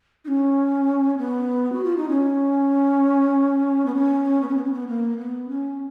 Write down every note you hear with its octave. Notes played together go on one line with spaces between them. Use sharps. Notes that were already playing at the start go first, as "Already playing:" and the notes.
D#4
C#4
B3
F#4
F4
D#4
C#4
B3
C#4
B3
C#4
B3
C#4
B3
A#3
B3
C#4